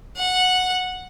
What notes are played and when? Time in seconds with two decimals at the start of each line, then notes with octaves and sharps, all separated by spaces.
0.17 F#5